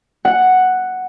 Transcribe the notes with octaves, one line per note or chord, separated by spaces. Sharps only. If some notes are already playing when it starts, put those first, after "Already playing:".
F#5